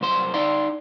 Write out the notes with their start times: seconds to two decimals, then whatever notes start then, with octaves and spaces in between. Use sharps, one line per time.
0.01 C2 F#2 C5 C6
0.34 D#4 D5 F5 C6